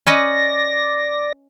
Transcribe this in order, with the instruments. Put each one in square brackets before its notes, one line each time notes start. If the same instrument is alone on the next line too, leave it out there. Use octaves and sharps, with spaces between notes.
[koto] C#4 B4 D#5 [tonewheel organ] D5 A#6